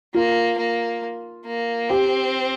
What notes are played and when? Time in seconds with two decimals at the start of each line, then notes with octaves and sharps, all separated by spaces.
0.14 A#3 F4
0.58 A#3
1.46 A#3
1.89 C4 G4